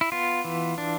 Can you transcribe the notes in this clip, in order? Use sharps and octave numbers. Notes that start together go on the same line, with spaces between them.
E4
B3 F4
E3
D4